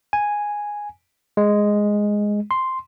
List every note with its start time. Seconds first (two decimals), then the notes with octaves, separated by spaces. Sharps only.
0.13 G#5
1.37 G#3
2.51 C6